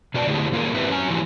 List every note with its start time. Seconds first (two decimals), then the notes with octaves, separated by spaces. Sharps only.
0.14 B2 F#4 D5 G#5 A5
0.27 D3 A3 E4 G4 G#4 C5
0.52 D#3 A#3 F4 F#4 G#4 A#4
0.74 G#2 C4 E4 G4 B4 E5
0.89 F#3 C#4 G#5
1.10 E3 F3 E4 F#4 G4